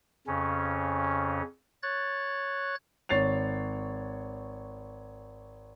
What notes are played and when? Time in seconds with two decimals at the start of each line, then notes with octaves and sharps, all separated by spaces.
0.27 F2 C#3 C#4
1.83 C#5 F#6 A6
3.09 G#1 C#5 A6 C7 F7